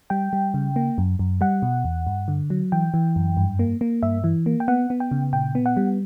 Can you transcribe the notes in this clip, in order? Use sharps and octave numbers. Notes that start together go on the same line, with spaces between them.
G3 G5
G3
C#3
A#3
F#2
F#2
G3 F#5
B2
E2
G2
D3
F#3
E3 G5
E3
F#2
G2
A#3
A#3
G2 E5
E3
A#3
G5
B3 F#5
B3
G5
C#3
A#2 G5
B3
F#5
G3